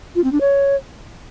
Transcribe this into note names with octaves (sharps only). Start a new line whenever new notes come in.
F4
C4
D4
C#5